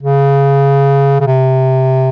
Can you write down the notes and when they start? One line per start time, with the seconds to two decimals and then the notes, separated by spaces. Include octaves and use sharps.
0.03 C#3
1.21 C#3
1.27 C3